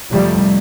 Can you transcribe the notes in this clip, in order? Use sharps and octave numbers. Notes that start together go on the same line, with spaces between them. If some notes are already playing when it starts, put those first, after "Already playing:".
F2 C3 F3 G3 A3